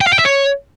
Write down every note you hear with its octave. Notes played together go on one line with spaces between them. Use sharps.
G5
F5
G5
E5
C#5